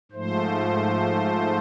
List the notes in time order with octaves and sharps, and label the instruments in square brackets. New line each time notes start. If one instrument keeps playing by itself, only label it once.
[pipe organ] G#2 F3 A3 C5